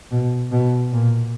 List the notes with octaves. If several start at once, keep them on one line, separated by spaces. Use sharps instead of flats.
B2
B2
A#2